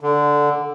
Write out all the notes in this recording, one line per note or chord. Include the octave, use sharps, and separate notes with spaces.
D3